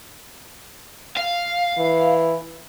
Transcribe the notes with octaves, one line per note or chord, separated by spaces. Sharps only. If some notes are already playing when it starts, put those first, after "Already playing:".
F5
E3